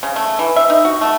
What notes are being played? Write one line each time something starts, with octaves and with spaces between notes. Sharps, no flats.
C#3
A3
E3
E5
D#4
F#4
A3